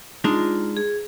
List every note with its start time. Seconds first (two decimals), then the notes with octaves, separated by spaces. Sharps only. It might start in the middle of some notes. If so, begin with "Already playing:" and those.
0.24 G#3 D4 D#4 F4
0.77 G#4